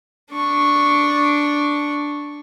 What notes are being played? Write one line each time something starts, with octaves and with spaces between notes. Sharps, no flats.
D4 C#6